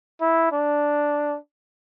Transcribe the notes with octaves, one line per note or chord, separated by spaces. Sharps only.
E4
D4